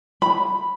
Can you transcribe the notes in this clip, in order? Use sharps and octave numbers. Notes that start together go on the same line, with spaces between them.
B5